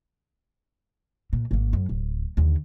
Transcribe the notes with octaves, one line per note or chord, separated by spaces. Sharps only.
A#2
G#1 A#3
F#2
D1
D#2 D3